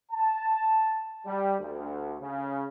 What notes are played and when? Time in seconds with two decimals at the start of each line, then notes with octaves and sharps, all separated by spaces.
0.12 A5
1.26 G3
1.60 D2
2.21 C#3